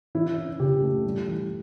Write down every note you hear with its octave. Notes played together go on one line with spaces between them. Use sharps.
E3 E4
C#4
C#3 G4
A3
G3
E3